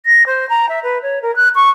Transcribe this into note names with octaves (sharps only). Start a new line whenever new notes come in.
A#6
C5
A#5
E5
B4
C#5
A#4
F#6
C#6